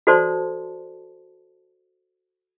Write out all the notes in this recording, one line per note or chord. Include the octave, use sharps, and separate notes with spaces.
F#4 A4 C5 D5 A5 C6